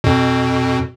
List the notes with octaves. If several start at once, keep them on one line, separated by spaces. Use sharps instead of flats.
F2 B2